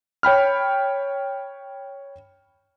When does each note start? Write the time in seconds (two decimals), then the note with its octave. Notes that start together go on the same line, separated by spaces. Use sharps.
0.23 C#5 G5 B5 F6